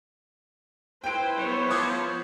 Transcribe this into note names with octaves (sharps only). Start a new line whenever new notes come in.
E4 B4 C5 G5 D7
B3 C#5
F3 D6 D#6 G#6